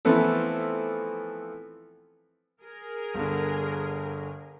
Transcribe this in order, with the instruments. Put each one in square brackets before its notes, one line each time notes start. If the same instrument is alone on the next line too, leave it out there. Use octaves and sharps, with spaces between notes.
[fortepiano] E3 F3 A3 B3 C4 A4
[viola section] G#4 A#4
[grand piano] G1 D3